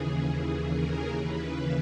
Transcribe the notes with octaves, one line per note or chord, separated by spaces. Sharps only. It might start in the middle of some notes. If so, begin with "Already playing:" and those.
Already playing: D#2 C#3 E3 G#4
G#4
A#4
D#2 C#3 E3 B4